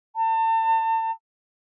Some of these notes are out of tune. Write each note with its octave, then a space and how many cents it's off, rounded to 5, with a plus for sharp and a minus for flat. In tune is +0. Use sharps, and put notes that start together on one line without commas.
A5 +35